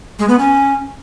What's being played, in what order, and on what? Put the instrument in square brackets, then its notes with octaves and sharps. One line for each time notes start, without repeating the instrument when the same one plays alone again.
[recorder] G#3
B3
C#4